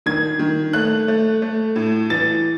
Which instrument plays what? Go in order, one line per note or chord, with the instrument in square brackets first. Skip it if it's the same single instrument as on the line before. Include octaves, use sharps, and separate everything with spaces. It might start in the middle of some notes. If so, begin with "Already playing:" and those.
[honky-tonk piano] D#3 G#6
D#3
A3 F#6
A3
A3
A2
E3 A6